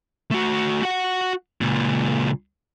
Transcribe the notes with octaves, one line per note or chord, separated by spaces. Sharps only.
A3 F#4
F#4 F#5
C#2 A#2